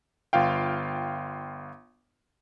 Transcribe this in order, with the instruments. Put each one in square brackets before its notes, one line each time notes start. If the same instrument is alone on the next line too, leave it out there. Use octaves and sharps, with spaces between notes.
[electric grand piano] G1 F4 F5 G5